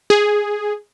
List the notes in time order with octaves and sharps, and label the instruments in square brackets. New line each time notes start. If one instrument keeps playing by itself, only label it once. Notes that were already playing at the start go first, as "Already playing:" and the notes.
[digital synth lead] G#4